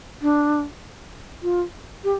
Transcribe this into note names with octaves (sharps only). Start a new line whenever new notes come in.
D4
F4
G4